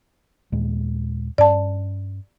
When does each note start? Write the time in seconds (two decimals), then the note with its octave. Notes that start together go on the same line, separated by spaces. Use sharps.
0.52 D#2 A#2 G#3
1.38 G2 C#4 D5 A5